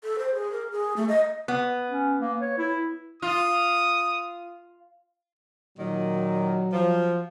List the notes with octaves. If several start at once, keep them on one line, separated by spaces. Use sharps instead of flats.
A4
C5
G#4
A#4
G#4
A3
D#5
B3
C#4
A#3
C#5
E4
F4 D#6
A#2 D#3 F#3
F3